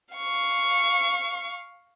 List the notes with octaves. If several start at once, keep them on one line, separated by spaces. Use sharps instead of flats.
F5 C#6